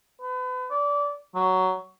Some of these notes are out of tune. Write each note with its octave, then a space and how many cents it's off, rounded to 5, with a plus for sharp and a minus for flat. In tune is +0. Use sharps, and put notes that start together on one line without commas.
B4 +35
D5 -25
F#3 +10